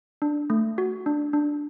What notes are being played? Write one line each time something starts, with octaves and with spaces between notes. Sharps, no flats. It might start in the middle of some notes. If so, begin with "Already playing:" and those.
D4
A3
F#4
D4
D4